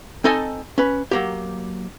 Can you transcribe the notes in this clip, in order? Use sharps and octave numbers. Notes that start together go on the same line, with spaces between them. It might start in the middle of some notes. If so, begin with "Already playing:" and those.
C4 D#4 A4 D#5 G#5 A5
C#4 B4
F#3 A#3 G4